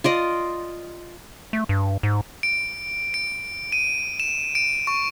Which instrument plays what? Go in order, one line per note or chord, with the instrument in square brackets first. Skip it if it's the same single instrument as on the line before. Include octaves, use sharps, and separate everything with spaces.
[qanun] F4 D5 D#5
[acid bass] A3
G2
G#2
[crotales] D7
D7
D#7
E7
D7
C#6